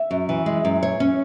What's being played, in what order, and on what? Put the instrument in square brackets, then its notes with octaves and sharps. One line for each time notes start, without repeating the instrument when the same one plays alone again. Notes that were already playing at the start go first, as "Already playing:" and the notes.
Already playing: [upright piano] E5
[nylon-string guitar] F#2
E3
G#3
F#2
C#5
C#4